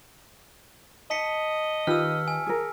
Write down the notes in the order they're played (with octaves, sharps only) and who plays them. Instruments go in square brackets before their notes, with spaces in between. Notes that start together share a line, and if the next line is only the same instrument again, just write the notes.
[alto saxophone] D#5 [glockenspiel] A5 B6 C#7
[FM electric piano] D#3 [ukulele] F4 G4 B4 [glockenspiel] E6 F6
[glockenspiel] G#5
[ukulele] G#4 A#4